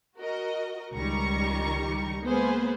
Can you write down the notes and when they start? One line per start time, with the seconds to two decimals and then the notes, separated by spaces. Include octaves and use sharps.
0.18 F#4 A#4 D#5
0.94 C#2 D#3 G3 A#5 C#6
2.25 G#3 A#3 B3 G#4 B4 C5